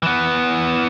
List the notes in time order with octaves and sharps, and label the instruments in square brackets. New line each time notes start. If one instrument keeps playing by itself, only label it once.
[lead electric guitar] E3 B3